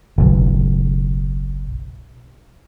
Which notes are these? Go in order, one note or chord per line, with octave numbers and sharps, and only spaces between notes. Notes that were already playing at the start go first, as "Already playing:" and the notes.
F#1 B1